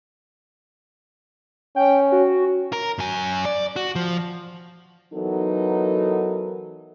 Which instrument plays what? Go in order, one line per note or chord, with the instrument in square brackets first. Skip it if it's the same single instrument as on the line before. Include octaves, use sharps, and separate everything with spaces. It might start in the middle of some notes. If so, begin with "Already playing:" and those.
[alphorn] C#4 [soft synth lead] G5
[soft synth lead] F#4
[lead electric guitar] A#4
F#2 G#5
D5
F#4
F3
[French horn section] E3 F#3 B3 D#4 A4 A#4